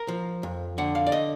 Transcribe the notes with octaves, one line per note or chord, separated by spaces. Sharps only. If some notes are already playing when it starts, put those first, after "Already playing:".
Already playing: A#4
F3
F2
D3 F#5
F5
D5
D#5